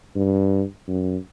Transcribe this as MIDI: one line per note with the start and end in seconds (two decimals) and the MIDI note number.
0.16 0.63 43
0.88 1.17 42